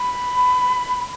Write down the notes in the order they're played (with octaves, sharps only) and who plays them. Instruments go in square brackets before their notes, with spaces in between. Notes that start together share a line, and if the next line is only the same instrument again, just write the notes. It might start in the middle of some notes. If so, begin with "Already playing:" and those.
Already playing: [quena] B5